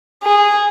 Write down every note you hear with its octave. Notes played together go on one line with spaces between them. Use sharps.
G#4